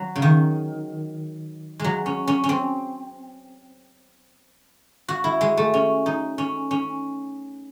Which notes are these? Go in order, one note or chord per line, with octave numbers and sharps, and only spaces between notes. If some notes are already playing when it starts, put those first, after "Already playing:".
Already playing: F#3
C#3
D#3
F#3 G#3
C#4
C#4
C#4
C4
F#4
E4
G#3
A3
C#4
D#4
C#4
C#4